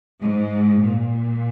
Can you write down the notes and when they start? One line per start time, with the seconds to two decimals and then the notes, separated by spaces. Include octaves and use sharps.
0.21 G#2
0.81 A#2